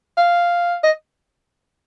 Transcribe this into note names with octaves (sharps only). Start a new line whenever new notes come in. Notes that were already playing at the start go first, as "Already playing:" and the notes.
F5
D#5